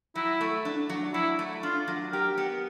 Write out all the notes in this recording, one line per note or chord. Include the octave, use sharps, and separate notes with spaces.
F#3 E4
A3
D4
F#3
F#3 E4
A3
D4 F4
F#3
G4 A#4
B3